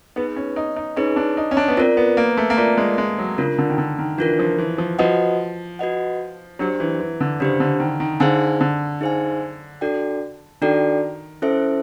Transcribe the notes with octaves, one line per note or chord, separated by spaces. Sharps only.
B3 D#4 G#4 B4
C#4
D#4
D#4
C#4 D#4 G#4 B4
D4
D#4
C#4
D4
B3
C4 F4 A#4 D5
B3
A#3
A3
A#3
A3 F4 A#4 D5
G#3
G#3
F#3
C#3 D4 F4 A#4
D3
D#3
D3
D#3
E3 D4 F4 A#4
F3
E3
F3
F3 F#4 B4 D#5 F#5
F#4 B4 D#5 F#5
F#3 D4 G4 C5
E3
E3
D3
C#3 D4 G4 C5
D3
D#3
D#3
D3 D#4 G#4 C5 F5 G#5
D3
D#4 G#4 C5 F5 G#5
D4 F#4 A4 D5 G5
D#3 D4 F#4 A4 D5 G5
C#4 E4 A4 C5 E5